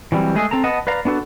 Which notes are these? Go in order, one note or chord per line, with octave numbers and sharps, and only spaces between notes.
E3 F#3 G3 C4
G#3 A3 G#4
C4 A4 A5 A#5
B3 D#5 F#5 A5
B4 D5 F5 A#5
B3 D4 F#4 A4 B4